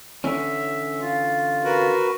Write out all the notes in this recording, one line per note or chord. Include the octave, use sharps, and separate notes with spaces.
D3 E3 C#4 E5
F4
F#4 A#4 B4